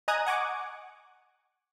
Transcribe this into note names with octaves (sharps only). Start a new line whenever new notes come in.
D#5 G#5 A#5 D#6 F#6 G#6
F#5 G#5 C#6 D6